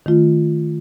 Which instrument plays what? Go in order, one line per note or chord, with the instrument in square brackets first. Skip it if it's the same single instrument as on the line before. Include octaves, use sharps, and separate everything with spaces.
[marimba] D#3 A3 F4